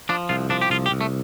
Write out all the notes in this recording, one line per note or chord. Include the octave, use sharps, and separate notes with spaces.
F3 D4
C2 F4
F3 D4
G4
C2 F4
G4
C2
A3